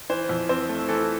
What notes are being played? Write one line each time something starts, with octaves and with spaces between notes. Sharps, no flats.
E3 C5
F2
C4 C5
A3
E3 A4